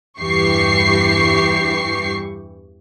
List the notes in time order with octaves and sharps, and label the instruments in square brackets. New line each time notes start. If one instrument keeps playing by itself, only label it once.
[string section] E2 G2 E3 G4 C#6 C7